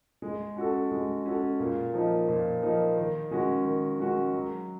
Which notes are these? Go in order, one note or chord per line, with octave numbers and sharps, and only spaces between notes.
G#3
C#4 F#4 A4
G#3
C#4 F#4 A4
A#2
F3 A#3 D#4
A#2
F3 A#3 D#4
D#3
G#3 C#4 F#4
D#3
G#3 C#4 F#4
F#3